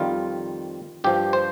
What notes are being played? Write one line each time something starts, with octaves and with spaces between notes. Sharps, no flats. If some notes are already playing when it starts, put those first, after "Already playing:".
Already playing: F2 D#3 G3 F4
G2 F3 G4
C5